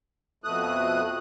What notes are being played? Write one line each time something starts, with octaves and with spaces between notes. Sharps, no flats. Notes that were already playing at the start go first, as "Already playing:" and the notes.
F2 B2 A3 D#6 F#6